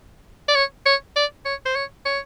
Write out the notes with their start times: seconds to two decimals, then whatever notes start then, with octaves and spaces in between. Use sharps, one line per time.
0.48 D5
0.55 C#5
0.86 C#5
1.16 D5
1.45 C#5
1.66 C5
1.75 C#5
2.05 C#5